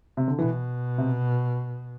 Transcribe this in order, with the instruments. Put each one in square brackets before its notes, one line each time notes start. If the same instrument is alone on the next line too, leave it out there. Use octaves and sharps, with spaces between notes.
[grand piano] C3
D3
[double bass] B2 [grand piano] E3
[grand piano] C3